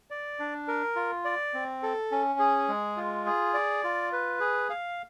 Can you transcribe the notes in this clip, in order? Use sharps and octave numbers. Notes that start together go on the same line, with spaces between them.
D5
D4
A#4
F4
D5
C4
A4
C#4
G#4
G#3
F4
G#4
D5
F4
B4
G#4
F5